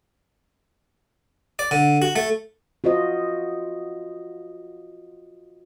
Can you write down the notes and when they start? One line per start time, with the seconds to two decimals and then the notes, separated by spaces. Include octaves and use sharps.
1.59 D5
1.71 D3
2.02 F#4
2.16 A3
2.84 F4 F#4 C5 D#5